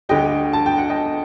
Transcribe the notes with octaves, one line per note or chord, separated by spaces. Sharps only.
D2 D3 G3 D#5 G5
A5
G5
F#5
D#5 G5